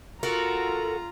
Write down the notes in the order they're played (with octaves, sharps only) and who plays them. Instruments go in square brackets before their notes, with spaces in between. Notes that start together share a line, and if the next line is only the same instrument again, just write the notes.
[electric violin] F4 A#5 [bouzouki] F#4 A4 A#4